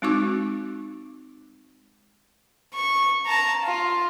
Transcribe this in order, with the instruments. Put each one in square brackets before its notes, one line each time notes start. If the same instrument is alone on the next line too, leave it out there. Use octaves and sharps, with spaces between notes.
[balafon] G#3 C4 D#4 F#4 C#6 D6
[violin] C#6
A5 A#5
F4